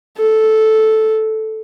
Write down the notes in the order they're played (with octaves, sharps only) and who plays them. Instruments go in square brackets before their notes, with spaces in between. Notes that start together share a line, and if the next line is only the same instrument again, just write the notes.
[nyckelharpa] A4